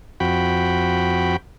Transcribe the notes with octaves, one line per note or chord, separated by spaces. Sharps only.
F2 F#4 G5 B5